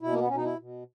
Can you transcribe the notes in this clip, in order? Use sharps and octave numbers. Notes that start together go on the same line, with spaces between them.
B2 E4
A#3
B3
B2 C#4
D#4
E4
B2